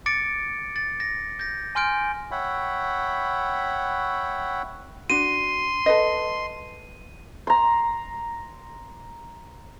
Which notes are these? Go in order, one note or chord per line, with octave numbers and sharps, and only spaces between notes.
D6 A6 C#7 D7
A6
A#6
G6 A#6
G#5 C6 F6 G6 D7
C#5 E5 F#5 G5 B5
D4 F#4 C6 D#7
A4 B4 D#5
A#5 C6